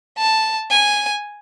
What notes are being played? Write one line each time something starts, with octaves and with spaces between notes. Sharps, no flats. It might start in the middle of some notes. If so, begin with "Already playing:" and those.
A5
G#5